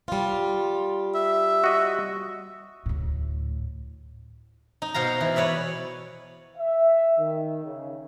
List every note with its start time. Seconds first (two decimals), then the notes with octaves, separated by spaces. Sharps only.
0.08 G3 F4
1.15 E5
1.64 F#4 D#5
2.86 D2 A2
4.82 D#4
4.94 B2 C5 F5 A#5
5.21 E3
5.36 B4 C#5 D5 E5
6.58 E5
7.19 D#3
7.64 C#3